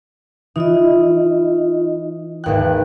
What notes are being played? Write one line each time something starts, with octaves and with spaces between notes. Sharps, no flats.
E3 D#4 F4 D#5
G#1 D#2 B4 G5 F#6